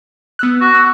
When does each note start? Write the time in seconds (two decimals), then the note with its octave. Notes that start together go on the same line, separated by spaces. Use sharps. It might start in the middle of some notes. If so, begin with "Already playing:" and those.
0.39 B3 E6 F#6
0.61 F#4
0.75 E6 F#6